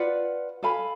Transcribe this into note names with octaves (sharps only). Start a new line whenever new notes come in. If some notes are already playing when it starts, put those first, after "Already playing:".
Already playing: F4 B4 D5 F#5
A4 F5 G#5 B5